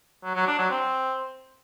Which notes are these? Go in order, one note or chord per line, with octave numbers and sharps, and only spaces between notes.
F#3
F#3
D4
F#3
C4